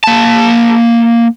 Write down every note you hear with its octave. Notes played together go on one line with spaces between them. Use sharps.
A#3 A5